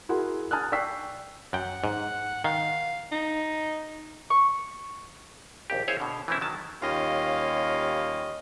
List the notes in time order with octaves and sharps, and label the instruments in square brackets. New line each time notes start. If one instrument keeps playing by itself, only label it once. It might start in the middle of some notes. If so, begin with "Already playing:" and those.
[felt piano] E4 F#4 G#4 A#4 F#5 C6
G#5 A5 D#6 F6 F#6
D5 G5 C#6 E6 B6 C7
[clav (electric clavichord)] F#2 G5 [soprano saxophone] F#5
[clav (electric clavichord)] G#2
[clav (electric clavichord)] D#3 [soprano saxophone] F5
[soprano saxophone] D#4
[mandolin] C#6
[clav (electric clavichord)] A#1 D#2 G4
E4 G#4 C5 C#5 E5 F5
B2 D3
E3 A3 C4 C#4 E4
D#3 F#3 D#5 A5
[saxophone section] D#2 G3 C#4 F4 D#5 F5